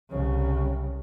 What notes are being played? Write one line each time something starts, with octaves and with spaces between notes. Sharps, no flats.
C2 C#3